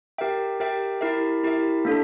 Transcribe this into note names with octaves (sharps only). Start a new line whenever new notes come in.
G4 A#4 E5 G5
G4 A#4 E5 G5
E4 G4 A#4 E5
E4 G4 A#4 E5
A#3 D4 A4